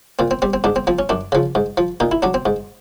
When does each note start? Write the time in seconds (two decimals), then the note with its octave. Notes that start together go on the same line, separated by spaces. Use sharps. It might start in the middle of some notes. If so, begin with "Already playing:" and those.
0.19 A#2 C4
0.31 C4
0.42 G3 C4
0.54 C4
0.64 G#2 D4
0.76 C4
0.87 F3 C4
0.99 C#4
1.09 F#2 D4
1.32 C#3 F3
1.55 G#2
1.77 F3
2.00 A#2 D#4
2.12 E4
2.23 F#3 D4
2.34 C4
2.46 G#2